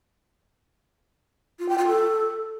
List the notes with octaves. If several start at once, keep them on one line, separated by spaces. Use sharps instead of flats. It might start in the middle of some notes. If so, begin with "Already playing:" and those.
F4
G5
F4
A4